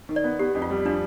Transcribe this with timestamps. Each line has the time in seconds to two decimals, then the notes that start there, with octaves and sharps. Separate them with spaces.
0.09 D#3
0.16 D5
0.24 B3
0.39 B3 G4
0.55 F2
0.62 F4
0.70 G3
0.85 F3 D4